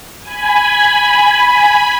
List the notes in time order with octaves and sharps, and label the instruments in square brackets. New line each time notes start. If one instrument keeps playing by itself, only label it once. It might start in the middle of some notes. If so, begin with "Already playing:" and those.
[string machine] G#5 B5